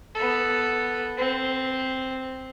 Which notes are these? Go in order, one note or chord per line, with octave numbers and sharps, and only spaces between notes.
B3 A4
C4